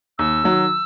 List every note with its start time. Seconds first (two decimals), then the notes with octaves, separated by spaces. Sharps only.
0.18 D#2 E6
0.44 D#3 F#3